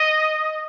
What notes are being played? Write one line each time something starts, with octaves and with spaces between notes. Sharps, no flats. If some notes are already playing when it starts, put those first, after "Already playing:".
Already playing: D#5